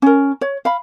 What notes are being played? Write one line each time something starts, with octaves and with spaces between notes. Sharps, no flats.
C#4 A#4
C#5
F5 B5